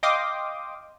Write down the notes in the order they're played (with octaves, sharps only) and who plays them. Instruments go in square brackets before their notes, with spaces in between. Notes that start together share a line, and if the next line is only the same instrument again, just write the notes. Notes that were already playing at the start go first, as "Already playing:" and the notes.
[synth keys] D#5 F5 G5 C6 D6 D#6